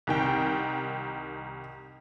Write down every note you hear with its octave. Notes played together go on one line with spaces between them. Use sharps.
C2 D#3 G5